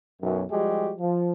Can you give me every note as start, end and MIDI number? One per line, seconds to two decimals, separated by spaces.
0.21 0.42 35
0.21 0.42 42
0.50 0.91 53
0.50 0.91 55
0.50 0.91 56
0.50 0.91 66
0.50 0.91 67
0.98 1.32 53